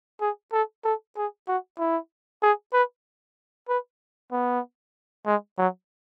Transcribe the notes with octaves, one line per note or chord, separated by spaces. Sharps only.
G#4
A4
A4
G#4
F#4
E4
G#4
B4
B4
B3
G#3
F#3